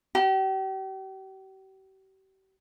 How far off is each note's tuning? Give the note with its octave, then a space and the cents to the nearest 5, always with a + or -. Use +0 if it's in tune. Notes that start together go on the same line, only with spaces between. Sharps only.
G4 -40